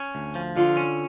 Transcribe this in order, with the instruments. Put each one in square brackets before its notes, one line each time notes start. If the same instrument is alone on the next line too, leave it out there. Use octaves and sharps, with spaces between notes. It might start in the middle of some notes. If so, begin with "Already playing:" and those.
Already playing: [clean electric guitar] C#4
D2
F3
[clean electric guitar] D3 [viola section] F4
[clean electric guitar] C#4